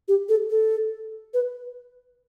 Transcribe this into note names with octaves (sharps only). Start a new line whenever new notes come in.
G4
A4
A4
B4